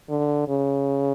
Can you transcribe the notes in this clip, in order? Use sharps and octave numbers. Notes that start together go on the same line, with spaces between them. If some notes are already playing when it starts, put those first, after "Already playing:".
D3
C#3